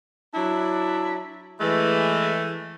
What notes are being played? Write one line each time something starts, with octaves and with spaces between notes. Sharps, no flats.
F#3 D4 E4
E3 G#3 A3